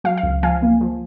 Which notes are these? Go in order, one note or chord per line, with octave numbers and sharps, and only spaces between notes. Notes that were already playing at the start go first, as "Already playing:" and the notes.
F#3 F5
F5
C#2
F3 F5 G#5
A#3
F3